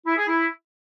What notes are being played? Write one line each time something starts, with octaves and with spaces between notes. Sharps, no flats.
E4
G#4
E4